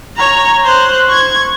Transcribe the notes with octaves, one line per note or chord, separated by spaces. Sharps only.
C#5 A#5
C5 F#6
C#6 G#6